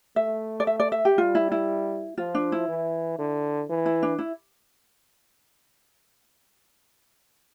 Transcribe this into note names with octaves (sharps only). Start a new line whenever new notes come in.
A3 E5
D5
E5
D5
E5
G4
G3 F4
E4
E4
F3 F4
D4
E4
E3
D3
E3
E4
D4
E4